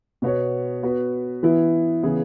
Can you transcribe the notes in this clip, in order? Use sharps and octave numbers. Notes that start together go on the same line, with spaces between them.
B2 B3 F#4 C#5
B3 F#4 B4
E3 B3 E4
C#3 E3 B3 G#4 B4